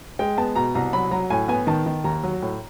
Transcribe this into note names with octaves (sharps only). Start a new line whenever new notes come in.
G#3 G5
B3 A5
B2 A#5
C2 A#5
F#3 B5
F#3 A#5
A2 G#5
B3 G#5
D#3 A5
D#3
D#2 A#5
F#3
A2